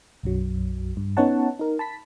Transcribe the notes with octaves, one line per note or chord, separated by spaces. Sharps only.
B1 F#2 F#3
G2
B3 C#4 D#4 C#5 F#5 A5
D#4 A#4
A5 B5 B6